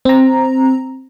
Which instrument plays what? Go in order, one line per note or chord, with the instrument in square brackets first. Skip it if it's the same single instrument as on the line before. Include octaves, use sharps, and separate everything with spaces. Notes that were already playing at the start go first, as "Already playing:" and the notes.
[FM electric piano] C4 A#5